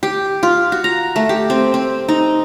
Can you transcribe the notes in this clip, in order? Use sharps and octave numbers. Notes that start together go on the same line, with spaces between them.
G4
F4
F#4
A#5
A3
G4
C4
C4
D#4